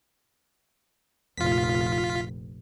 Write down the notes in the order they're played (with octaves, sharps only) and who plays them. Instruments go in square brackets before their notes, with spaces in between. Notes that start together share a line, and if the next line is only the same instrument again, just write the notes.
[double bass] F1 A#1 [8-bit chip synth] F4 B6